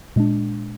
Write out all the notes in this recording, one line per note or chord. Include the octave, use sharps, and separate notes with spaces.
A#2 G#3 D4